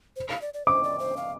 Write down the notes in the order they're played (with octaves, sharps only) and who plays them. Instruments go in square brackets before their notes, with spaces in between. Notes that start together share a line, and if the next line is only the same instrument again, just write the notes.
[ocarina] C5
F5
D5
D5
[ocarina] C5 [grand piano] D6
[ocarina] D5
C5
F5